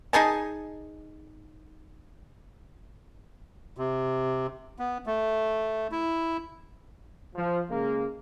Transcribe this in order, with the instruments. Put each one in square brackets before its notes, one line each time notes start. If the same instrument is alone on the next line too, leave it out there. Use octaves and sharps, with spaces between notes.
[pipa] D#4 G#4 G#5 A5
[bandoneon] C3
B3
A3
E4
[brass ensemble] F3
C#3 G#3 A#3